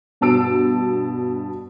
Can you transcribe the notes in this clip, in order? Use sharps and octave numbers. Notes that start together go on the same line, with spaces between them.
G2 B2 A5 E6 D7